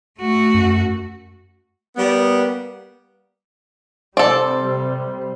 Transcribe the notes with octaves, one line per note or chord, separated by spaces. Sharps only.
A3 F#4
F#2
G3 A#3 B3
C3 G3 A4 C5 D5